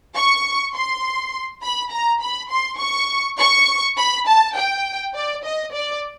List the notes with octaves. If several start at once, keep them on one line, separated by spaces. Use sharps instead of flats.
C#6
C6
B5
A#5
B5
C6
C#6
C#6
B5
A5
G5
D5
D#5
D5